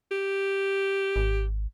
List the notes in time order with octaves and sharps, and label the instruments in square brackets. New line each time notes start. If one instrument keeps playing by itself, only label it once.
[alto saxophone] G4
[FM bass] G#1